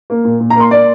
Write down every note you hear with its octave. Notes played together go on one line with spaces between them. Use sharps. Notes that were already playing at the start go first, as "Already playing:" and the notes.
A#3
A#2
A#2
A#5
A#3 C6
A#3 D5